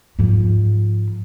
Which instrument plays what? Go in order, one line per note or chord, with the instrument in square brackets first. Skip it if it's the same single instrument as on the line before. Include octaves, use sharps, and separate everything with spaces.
[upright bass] G#2 F3